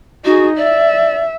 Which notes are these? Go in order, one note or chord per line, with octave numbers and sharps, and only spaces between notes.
D#4 F#4 G#4
D5 E5